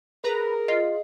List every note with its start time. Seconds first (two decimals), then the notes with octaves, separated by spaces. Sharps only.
0.24 G#4 A#4 B4 A#5
0.68 F4 D#5 C7